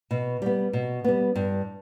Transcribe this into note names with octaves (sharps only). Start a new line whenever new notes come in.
B2
G3 B3
B2
G3 B3
G2